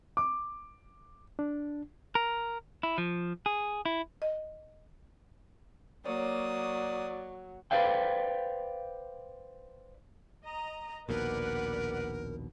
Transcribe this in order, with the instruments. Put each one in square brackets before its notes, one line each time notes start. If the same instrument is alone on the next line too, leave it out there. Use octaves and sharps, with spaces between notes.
[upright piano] D6
[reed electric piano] D4
[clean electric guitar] A#4
E4
F3
G#4
E4
[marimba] D#5
[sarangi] F#3 [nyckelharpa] A#3 D#6 [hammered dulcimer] C#5 [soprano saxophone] D5
[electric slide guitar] B4 C5 D5 F5 G5
[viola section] D#5 A#5
[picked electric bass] A#1 D#2 B2 [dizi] A#4 [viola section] B4 D5 F#5